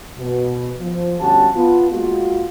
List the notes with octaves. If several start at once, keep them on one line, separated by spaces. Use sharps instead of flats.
B2
F3
G1 D2 C#4 F#4 G4 A5
B3 F4
G#3 A#3 F4 F#4